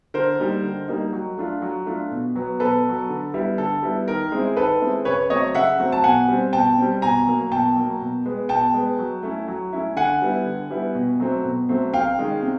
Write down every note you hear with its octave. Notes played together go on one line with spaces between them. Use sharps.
D3 A#4 C5
G3 A#3 D#4
D3
G3 A#3 D#4
F#3
A3 D4 F4
F#3
A3 D4 F4
B2
F#3 B3
B2 A4 B4
F#3 B3
D3
G3 B3 E4
D3 A4
G3 B3 E4
D#3 A#4
G#3 C4 E4
D#3 A4 B4
G#3 C4 E4
C#3 B4 C#5
F#3 A3 C4 C#5 D#5
C#3 E5 F#5
F#3 A3 C4
A5
B2 F#5 G#5
G3 C4
B2 G5 A5
G3 C4
B2 G#5 A#5
F#3 A#3
B2 G5 A5
F#3 A#3
B2
G#3 B3
B2 G5 A5
G#3 B3
F#3
A3 C#4 E4
F#3
A3 C#4 E4
D3 F#5 G#5
G3 B3 E4
D3
G3 B3 E4
B2
F#3 A3 C4
B2
F#3 A3 C4
C3 F5 G5
D#3 G#3 C#4
C3